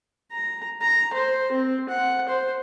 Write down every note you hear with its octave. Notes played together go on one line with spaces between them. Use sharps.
A#5
A#5
C5
C4
F#5
C5